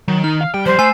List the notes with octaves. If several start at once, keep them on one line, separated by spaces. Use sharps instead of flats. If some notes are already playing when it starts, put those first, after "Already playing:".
D#3 F#3
D#4 F6
F5
G3 G5
F3 G4 C5
A3 G#5 E6 C7